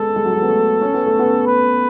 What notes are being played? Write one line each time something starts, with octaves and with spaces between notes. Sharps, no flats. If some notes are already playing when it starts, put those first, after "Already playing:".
Already playing: G#3 B3 A4
G#3
F#3
G#3
B3
A3
C#4
B3
A3
B3
B4